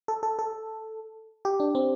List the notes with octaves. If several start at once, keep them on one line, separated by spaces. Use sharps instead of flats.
A4
A4
A4
G4
D4
C4